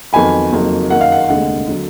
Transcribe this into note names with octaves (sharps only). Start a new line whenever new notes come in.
F2 D#3 F#3 B3 G#5 B5
F#1 F2 D#3 F#3 A#3
F#2 D#3 A#3 F#5
F5
F#5
F1 D#2 D3 G#3 F#5
D3 F#3